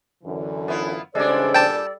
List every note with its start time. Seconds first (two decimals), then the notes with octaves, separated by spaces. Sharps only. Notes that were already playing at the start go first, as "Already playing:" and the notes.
0.24 F#2 D3 E3
0.68 B3 E4 F4
1.15 E2 C#3 G3 G#3 D4 A4 C5 D5
1.54 A#2 D4 G5 A5